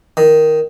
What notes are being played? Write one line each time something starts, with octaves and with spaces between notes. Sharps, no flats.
D#3